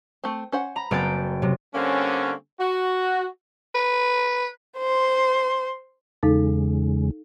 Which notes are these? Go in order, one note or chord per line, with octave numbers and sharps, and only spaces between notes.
A3 C4
C#4 C5 F#5
A#5 B5
F#1 B3 C4 G#4 G5 A6
C3 F#3
D3 G3 A#3 C4 C#4
F#4
B4
C5 C6
E2 C#3 G#3 D#4 A4 F5